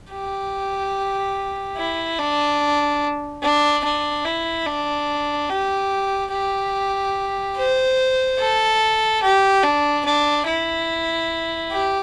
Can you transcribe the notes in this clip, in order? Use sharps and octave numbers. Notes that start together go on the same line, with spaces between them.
G4
E4
D4
D4
D4
E4
D4
G4
G4
C5
A4
G4
D4
D4
E4
G4